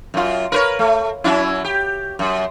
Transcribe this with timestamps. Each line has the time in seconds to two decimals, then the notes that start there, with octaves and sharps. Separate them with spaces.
0.14 F#2 F4
0.52 A#4 B4 C#5
0.79 A3
1.24 F#3 C#4 E4
1.64 G4
2.19 F#2